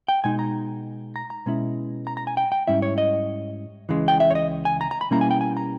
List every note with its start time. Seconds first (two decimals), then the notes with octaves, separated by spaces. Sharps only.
0.08 G5
0.24 B2 G#3 D#4 G#5
0.39 A#5
1.16 A#5
1.30 A#5
1.46 B2 G#3 C#4 E4
2.07 A#5
2.17 A#5
2.27 G#5
2.37 G5
2.52 G5
2.67 G#2 G3 C#4 E4 E5
2.82 C#5
2.98 D#5
3.89 C#2 C#3 E3 G#3
4.08 G5
4.20 E5
4.30 C#5
4.35 D#5
4.65 G#5
4.81 A#5
4.91 A#5
5.01 B5
5.11 B2 G3 A#3 C#4 E4 A#5
5.21 G#5
5.31 G5
5.41 G#5
5.57 A#5